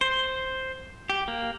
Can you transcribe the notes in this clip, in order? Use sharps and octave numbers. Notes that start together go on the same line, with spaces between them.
C5
G4
A#3